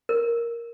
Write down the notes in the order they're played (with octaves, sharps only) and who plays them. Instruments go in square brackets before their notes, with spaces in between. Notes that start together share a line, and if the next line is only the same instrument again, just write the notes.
[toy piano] A#4